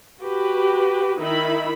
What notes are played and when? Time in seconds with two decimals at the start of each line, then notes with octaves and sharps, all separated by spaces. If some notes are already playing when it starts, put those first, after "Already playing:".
0.19 F#4 G4 B4
1.18 D#3 D#4 E4 E5 B5